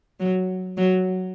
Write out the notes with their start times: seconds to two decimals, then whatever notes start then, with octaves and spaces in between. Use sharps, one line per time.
0.20 F#3
0.77 F#3